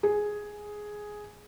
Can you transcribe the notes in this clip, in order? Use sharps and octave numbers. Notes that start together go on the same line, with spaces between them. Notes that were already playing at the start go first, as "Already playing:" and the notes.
G#4